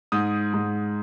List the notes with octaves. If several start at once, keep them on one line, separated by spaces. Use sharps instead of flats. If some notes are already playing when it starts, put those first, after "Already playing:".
G#2 D#6
G#2